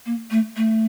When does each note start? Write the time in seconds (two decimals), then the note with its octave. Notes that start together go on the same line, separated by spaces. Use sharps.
0.06 A#3
0.31 A3
0.57 A3